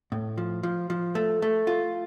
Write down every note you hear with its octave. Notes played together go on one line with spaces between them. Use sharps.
A2
F3
F3
F3
A3
A3
F4